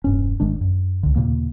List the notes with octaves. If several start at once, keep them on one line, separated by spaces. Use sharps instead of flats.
E1 G2 C#4
G#1 D#3 G#3 D4
F#2
C#2 D3
D#2 A#2 C#3 A#3